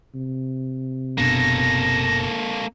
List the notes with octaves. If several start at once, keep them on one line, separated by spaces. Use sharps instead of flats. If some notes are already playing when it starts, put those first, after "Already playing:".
C3
F#1 B2 A#3 D4 A4 A#6